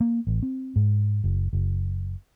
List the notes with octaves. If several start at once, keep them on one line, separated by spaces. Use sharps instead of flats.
A#3
A1
C4
G#2
F#1
F#1